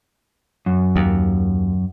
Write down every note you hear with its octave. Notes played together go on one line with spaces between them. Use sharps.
F#2
D#2